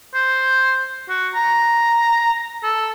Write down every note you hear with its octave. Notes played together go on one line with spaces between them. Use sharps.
C5
F#4
A#5
A4